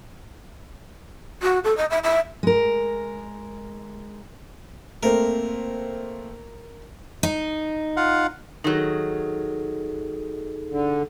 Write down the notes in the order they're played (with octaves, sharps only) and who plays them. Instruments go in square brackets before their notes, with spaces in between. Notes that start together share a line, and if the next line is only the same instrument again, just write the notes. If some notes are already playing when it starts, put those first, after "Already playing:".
[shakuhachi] F#4
A4
D#5
E5
E5
[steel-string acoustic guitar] G#3 A#4
[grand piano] A3 A#3 C4 [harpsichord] A#4
[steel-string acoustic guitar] D#4
[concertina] F4 F5 F#5
[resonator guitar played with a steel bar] D#3 F#3 [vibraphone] D#4 G#4 A4
[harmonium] D3